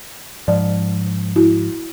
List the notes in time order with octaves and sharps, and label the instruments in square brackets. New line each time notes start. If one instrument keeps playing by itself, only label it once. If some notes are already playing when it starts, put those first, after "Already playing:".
[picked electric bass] G#2 F3 [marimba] D5
[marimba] E4 F#4